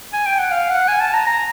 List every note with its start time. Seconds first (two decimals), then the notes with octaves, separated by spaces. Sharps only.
0.13 G#5
0.26 G5
0.39 F#5
0.51 F5
0.70 F#5
0.88 G#5
1.01 A5
1.14 A#5
1.27 A#5